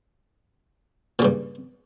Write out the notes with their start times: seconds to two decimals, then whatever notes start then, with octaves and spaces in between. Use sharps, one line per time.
1.19 A#2
1.22 C#3
1.25 G2